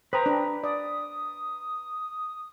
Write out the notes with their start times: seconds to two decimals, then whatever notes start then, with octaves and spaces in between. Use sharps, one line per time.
0.13 B4 C5 G5 A#5 D#6
0.26 D4
0.63 D5 D#6